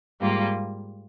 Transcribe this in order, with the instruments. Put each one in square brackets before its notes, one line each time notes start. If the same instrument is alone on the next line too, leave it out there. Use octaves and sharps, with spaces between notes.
[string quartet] G#2 G3 A#3 F4